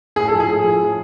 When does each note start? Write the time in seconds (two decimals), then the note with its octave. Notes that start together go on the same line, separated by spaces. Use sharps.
0.16 A2 G#4
0.28 F3 A4
0.40 G#4
0.48 A2
0.64 F3
0.80 A2